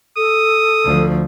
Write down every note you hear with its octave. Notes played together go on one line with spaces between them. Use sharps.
A4 D#6
D2 F3